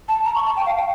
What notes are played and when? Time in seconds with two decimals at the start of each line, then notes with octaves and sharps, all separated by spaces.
0.08 A5
0.25 A#5
0.35 C#6
0.45 A5
0.57 G5
0.66 F5
0.77 G5